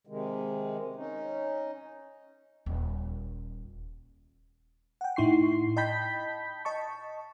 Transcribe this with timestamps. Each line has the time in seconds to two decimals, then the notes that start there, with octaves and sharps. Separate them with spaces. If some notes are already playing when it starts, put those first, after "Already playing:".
0.07 C3 D#3 G#3
0.95 C#4 D#4
2.66 D#1
5.01 F#5 G5
5.16 A2 D#4 E4 C6 C#6 C7
5.77 D#5 G5 A5 B5 G6 B6
6.65 D#5 A5 C#6